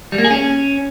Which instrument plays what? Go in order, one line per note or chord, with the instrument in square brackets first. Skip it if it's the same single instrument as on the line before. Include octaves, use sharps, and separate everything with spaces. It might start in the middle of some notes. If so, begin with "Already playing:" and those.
[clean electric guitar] G3
A#3
G#4
C#4